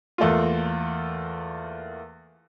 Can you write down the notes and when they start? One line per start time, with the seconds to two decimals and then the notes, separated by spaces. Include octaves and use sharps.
0.18 E2 A3 A#3 F4